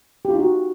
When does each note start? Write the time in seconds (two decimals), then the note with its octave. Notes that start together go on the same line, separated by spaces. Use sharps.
0.25 G4
0.30 F4
0.35 D#4
0.40 F#4